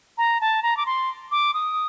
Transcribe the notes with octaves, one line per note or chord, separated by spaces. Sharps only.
A#5
A5
A#5
D6
C6
D6
D#6